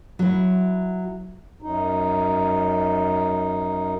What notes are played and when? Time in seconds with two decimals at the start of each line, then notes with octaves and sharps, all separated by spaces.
0.19 F#3 E4
1.62 F#2 D#4